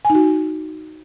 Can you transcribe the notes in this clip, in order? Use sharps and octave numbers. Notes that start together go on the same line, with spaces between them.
G#5
D#4
F#4